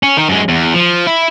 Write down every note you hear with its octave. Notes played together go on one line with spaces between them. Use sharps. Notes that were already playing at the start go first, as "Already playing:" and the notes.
C#4
D#3 D#4
F#2 G#3
E2
F3
E4